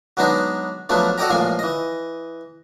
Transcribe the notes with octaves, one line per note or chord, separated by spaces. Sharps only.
F#3 G#3 B3 D4 D#4 G#4
F3 F#3 A3 B3 D4
F#4 A4 D5 D#5 G5 A#5
A1 A#2 F3 G#3 G#5 C6
E3 D#5